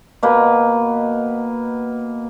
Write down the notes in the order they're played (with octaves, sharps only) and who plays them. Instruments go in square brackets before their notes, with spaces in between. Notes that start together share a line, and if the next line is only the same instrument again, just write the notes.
[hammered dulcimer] B2 A#3 B4 G5